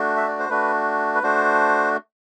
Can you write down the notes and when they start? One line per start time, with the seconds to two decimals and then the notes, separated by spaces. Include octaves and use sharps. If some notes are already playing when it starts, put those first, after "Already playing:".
Already playing: A3 D4 F#4
0.17 E5
0.28 D5
0.39 C5
0.49 A3 D4 F#4 B4
1.15 B4
1.23 A3 D4 F#4 C5